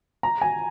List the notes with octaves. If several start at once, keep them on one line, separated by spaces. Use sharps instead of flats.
A#5
G#5